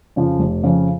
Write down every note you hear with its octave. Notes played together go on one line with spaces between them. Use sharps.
F2 C#3 F3
F1
F2 C#3 F3